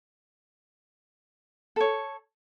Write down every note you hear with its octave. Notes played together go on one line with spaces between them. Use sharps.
A4 C#5